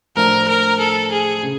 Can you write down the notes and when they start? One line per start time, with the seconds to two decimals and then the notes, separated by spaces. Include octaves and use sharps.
0.16 A2 F3 A3 D4 A#4
0.48 A#4
0.79 A4
1.12 G#4
1.43 C#3